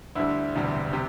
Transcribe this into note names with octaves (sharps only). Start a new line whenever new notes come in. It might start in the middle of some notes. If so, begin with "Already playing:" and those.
D2 D3 G3 E4
E1 D2 C3 G3
C3 G4